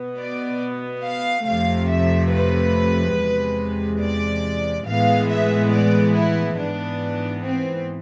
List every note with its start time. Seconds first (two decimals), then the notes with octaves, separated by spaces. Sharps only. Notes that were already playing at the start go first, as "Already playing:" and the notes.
Already playing: B2 B3
0.18 D5
1.03 F5
1.45 F2 C3 F3 A3 F5
1.89 E5
2.31 B4
3.16 E2 C3 G#3
4.01 D5
4.86 A2 E3 G#3 B3 F5
5.30 E5
5.72 D5
6.14 E4
6.57 G#2 E3 B3 D4
7.42 C4